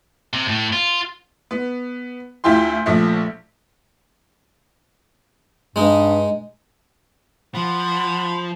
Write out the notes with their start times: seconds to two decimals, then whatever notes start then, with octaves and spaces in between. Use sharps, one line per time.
0.33 C3
0.48 A2
0.73 F4
1.51 B3
2.44 D2 E4 F4 G4 C6
2.86 A#1 F3 A3
5.76 G2 G#3 D#4
7.54 F3 F#5 B5 C6